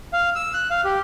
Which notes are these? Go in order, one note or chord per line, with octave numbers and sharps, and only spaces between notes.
F5
E6
F#6
F5
G4